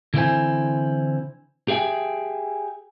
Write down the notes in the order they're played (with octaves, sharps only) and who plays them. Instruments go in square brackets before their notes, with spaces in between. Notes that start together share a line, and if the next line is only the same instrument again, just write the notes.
[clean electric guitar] D3 E3 C4 E4 C5 G#5
G4 G#4 E5 G5 G#5